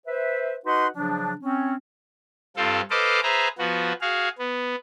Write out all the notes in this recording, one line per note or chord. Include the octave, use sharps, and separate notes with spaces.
B4 C5 E5
D#4 F#4 B4 D#5 F#5 C6
C#3 F3 F#3 D4
C4 C#4
G2 C4 F4 A4
A4 B4 C5 D#5 F5 D6
G#4 B4 C5 E5 A#5
F3 B3 F#4
F#4 G#4 F5
B3